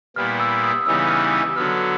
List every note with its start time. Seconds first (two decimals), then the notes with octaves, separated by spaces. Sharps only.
0.16 A#2 G3 B3 E4 F6
0.40 E6
0.63 D#6
0.86 C#3 E3 G3 B3 D#4 E6
1.09 F6
1.33 E6
1.56 D3 F#3 B3 F6